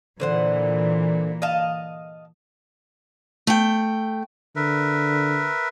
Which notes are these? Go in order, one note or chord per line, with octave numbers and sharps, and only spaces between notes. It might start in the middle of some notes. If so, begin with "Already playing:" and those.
A#2 D3 E3 C5 F#5
D#5 F5 A5
A3 G5
D3 A#4 B4 E5